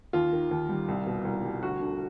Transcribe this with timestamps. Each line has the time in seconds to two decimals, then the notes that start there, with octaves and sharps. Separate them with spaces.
0.13 D#2 F4
0.33 D#3
0.51 D#2
0.69 G3
0.88 C2
1.07 B2
1.25 C2
1.43 G3
1.62 D2 F#4
1.80 D3